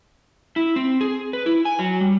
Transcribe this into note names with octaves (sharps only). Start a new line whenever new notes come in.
E4
C4
G#4
B4
E4
G#5
F#3
G3